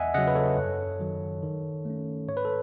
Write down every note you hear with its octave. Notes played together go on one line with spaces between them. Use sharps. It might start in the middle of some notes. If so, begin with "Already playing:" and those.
Already playing: E2 D#5 E5 F#5 G#5
C#3 F#3 D#5 F#5
B4
A4 C#5
F#2
D#3 F#3
D#3
A3 C#4
G#2 C#5
B4
A4